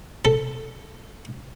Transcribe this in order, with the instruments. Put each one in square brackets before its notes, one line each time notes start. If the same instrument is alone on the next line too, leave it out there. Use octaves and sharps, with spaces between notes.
[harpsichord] A4